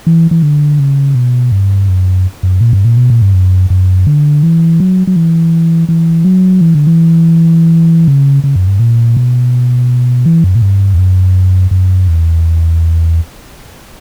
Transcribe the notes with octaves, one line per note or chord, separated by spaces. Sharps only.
E3
E3
D3
C#3
B2
G2
F#2
F#2
A#2
G2
A#2
B2
A#2
G2
F#2
F#2
D3
E3
F#3
F#3
E3
E3
F#3
E3
D3
E3
C#3
C#3
F#2
G2
A#2
B2
E3
F#2
A#2
G2
E2
F#2
F#2
E2